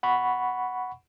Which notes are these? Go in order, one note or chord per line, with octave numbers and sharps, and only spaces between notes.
F#5 B5 C#6